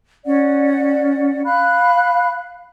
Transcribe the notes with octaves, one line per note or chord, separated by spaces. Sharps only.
C#4 D5 F#5
F5 B5 F#6